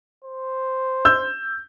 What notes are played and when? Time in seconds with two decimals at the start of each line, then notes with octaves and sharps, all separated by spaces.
0.24 C5
1.05 E6 G6